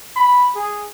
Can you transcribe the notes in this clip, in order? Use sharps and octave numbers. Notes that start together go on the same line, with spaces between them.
B5
G#4